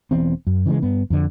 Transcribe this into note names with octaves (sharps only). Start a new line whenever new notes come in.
E1 E3 B3 C4
F#2
C#3 E3 F#3 G#3
G2 B3
F2 D3